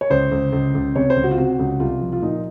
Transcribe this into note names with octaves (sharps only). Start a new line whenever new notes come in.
C#5
C#2 C5
C#2
C#2
C#2
C3 C#5
C5
C#2
F#4
F4
C3 F#4
C#2
C2 F4
F3
F4
A#2 D#4